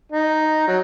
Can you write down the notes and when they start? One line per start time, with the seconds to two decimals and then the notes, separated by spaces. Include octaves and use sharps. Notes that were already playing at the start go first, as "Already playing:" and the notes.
0.12 D#4
0.67 F#3